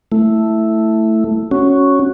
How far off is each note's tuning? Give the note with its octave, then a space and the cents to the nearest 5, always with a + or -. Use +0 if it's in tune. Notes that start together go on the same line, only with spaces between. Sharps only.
A3 +5 E4 +0
C#4 +0 F#4 +0